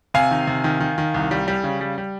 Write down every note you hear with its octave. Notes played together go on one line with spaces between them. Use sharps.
C3 F5 G#5
D#3
C3
D#3
D#3
D#3
C2
G3
G3
C#3
G3
G3